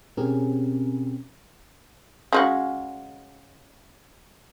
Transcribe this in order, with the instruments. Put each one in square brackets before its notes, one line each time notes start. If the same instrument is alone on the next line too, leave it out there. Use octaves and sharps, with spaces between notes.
[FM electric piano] B2 C4 C#4 G4 G#4 A#4
[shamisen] C#3 G#3 F#4